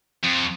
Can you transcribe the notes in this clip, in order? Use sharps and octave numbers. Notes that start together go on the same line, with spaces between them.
F2